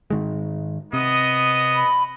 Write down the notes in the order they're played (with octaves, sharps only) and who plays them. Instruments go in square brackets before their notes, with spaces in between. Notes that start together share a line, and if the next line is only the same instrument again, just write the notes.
[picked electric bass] G#2 D#3 G#3
[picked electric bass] C3 [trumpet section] B3 D#5
[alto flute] B5